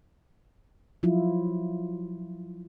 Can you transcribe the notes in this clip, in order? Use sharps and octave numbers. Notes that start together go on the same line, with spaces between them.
F3 F#3 E4 F4